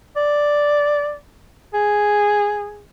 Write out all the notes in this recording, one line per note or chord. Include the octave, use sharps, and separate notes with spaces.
D5
G#4